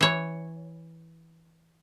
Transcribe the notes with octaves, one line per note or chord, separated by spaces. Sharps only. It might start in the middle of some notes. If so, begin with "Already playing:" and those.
E3 C#5